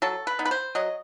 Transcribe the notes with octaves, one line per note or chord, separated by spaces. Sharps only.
F#3 A4
B4
B3 D#4
B4
C5
F#3 D#5